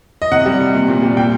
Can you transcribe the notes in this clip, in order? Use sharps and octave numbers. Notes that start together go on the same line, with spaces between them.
D#5
C3 F#5
G3
C3
A#2
A#2
G3
A#2 G5